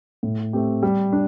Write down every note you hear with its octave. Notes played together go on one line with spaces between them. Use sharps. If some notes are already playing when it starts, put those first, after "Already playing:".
A2
A3 C4 G4
G3
D4